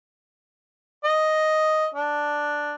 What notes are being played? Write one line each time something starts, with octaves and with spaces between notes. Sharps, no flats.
D#5
D4